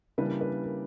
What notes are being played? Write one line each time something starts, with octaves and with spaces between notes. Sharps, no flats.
C#3 E3 G3 A#3 D4 B4
B4
A#4